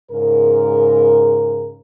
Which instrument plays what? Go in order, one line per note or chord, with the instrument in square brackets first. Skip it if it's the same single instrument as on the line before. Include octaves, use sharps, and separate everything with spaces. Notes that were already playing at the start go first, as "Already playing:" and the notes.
[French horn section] G#2 C#3 A#4